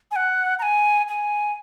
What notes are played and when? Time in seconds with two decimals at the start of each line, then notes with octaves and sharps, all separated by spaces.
0.11 G#5
0.16 F#5
0.59 A#5
0.62 G#5
1.08 G#5